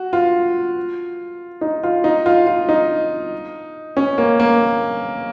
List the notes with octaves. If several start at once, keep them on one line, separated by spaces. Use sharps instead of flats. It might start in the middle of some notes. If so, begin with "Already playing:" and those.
Already playing: F#4
F4
D#4
F4
D#4
F4
F4
D#4
C#4
A#3
A#3